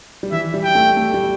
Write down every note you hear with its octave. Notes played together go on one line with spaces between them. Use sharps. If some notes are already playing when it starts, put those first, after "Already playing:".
G3
E3 E5
G3
G5
A3
A3
G3